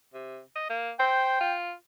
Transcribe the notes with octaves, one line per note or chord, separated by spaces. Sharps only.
C3
D#5
A#3
C5 G5
F4